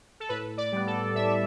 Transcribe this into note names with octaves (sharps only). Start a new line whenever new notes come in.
A4
A2 B4
D5
G3 B3
A4
A2 E5